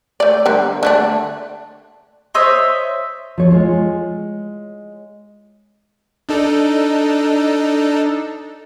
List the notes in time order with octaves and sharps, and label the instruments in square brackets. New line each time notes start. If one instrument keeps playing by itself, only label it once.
[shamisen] A3 D5
D3 G3 A#4
D3 A3 D4
[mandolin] C5 C#5 D#5 E5
[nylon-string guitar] F3 C#5
G#3 F4 C#5
[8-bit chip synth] D4 D#4 A4